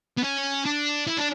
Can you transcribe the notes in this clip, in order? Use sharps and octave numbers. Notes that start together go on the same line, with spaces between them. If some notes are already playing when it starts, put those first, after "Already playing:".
B3
C#4
D4
E4
D4